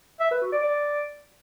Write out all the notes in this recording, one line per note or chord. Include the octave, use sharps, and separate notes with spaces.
E5
B4
F#4
D5
D5